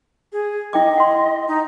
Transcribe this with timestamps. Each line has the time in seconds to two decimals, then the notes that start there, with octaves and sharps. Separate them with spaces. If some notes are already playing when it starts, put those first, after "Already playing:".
0.33 G#4
0.73 E4 D#5 G5 D6
0.97 F#5 C6
1.48 D#4